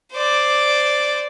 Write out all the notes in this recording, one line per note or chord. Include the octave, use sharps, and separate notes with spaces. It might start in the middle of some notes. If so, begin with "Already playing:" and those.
C5 D5